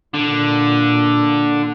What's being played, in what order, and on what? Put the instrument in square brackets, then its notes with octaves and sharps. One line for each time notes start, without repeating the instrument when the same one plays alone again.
[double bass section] A#2 [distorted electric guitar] D3